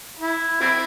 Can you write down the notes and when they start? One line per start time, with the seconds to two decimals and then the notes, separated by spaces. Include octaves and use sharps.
0.20 E4
0.61 C4 E4